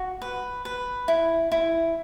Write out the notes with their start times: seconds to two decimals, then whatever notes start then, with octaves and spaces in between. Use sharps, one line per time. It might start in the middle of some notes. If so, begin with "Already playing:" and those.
Already playing: F#4
0.22 B4
0.65 B4
1.08 E4
1.52 E4